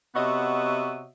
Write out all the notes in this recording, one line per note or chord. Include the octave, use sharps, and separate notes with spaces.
C3 B3 F#4 C#5 D#5 E5